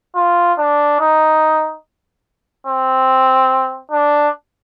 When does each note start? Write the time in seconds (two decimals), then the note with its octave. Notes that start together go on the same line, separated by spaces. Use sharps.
0.16 F4
0.58 D4
1.00 D#4
2.67 C4
3.91 D4